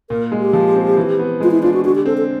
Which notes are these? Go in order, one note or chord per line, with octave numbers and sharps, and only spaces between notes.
A#2 A#4
G#3
G4
F3
C4
E3
B3
G#3 F4
E4
D4 F4
F#4
D3 F#4
G4
C4 A4
A4